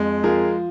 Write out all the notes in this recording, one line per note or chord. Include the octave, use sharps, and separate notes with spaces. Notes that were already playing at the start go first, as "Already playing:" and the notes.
Already playing: F2 G#3
F3 G#4 A#4